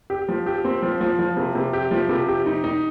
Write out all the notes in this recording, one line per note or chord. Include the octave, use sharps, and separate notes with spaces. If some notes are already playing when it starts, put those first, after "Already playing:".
G4
F3
G4
C4
F3
F3
F3
C3
C3
G4
F3
C3
G4
D#4
D#4